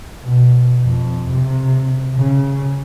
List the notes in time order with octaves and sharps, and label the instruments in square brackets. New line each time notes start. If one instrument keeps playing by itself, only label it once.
[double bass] B2
F2
C3
C#3